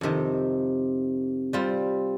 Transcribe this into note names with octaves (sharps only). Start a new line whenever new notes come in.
F2 C3 D#3
G3 C4 F4